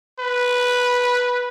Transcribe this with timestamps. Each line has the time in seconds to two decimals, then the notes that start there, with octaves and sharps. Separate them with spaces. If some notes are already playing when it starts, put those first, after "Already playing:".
0.19 B4